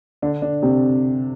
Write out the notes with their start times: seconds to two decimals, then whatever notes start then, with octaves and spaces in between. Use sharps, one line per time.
0.22 D3 D4
0.42 D3 D4
0.62 C3 C4